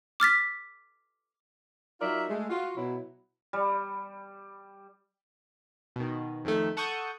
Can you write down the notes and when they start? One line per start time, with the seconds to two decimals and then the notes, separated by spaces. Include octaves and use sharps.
0.20 D6 F6 A6 B6
2.01 F#3 D#4 F4 A#4 D5 E5
2.30 G#3 A3
2.50 F4 F#4
2.77 B2 F#3 E4
3.53 G3
5.96 B2 D#3
6.45 F2 D#3 A3
6.77 A4 F#5 A5 C#6 D#6 G6